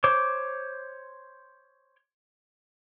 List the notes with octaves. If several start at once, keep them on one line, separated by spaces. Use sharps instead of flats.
C5 C#5 D6